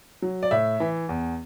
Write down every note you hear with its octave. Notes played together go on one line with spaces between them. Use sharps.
F#3
D5
A2 E5
E3
E2